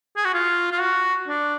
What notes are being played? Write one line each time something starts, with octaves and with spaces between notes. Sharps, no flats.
G#4
F#4
F4
F4
F#4
D4